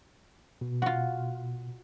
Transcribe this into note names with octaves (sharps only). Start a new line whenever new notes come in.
B2
F4 F#4